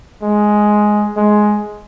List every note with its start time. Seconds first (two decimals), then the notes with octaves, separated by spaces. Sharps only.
0.22 G#3
1.16 G#3